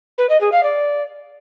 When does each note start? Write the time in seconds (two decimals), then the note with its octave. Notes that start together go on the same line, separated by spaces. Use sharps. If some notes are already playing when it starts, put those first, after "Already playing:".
0.18 B4
0.29 D#5
0.41 G#4
0.52 F5
0.63 D5